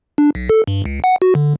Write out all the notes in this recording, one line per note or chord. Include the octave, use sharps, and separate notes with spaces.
D4
B1
A4
G2
C#2
F#5
F#4
D3